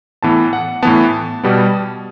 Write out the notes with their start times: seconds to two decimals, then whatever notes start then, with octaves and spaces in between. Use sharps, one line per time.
0.23 A2 E3 B3 A5
0.53 F#5
0.82 A2 E3 B3 A5
1.43 B2 G3 B3